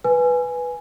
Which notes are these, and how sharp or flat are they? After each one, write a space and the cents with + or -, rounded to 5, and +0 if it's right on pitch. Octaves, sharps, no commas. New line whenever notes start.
B4 +0 G#5 +0